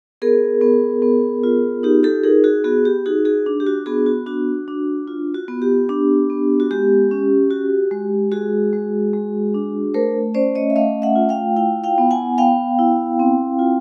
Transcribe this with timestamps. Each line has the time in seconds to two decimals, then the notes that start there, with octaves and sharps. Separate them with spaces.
0.22 B3 G#4 A#4
0.61 B3
1.02 B3
1.44 F4
1.83 D#4 G4
2.03 G4 A4
2.24 D#4 G#4 A#4
2.44 F#4 G#4
2.64 B3 F#4 G#4
2.85 G4
3.06 D#4 F#4 G#4
3.25 F#4 G#4
3.46 D4
3.60 G4
3.67 F#4
3.86 B3 F#4 G#4
4.06 F#4
4.26 D4 F#4
4.68 D4
5.08 F4
5.34 F#4
5.48 B3
5.62 G4
5.89 D4
6.30 B3
6.60 F#4
6.71 G#3 G4
7.11 C#4
7.51 F#4
7.91 G#3
8.32 G#3 F#4 G#4
8.73 G#3
9.13 G#3
9.54 D4
9.94 A3 A#4 C5
10.34 C#4 C5 D5
10.55 C#5 D#5
10.70 E5
10.76 A3 D#5 F5
11.02 E5 F#5
11.16 F4
11.29 F5 G5
11.56 E4 F5 G5
11.84 F5 G5
11.98 B3
12.11 F#5 G#5
12.38 B3 F5 G5
12.79 E4
13.20 C4
13.59 F4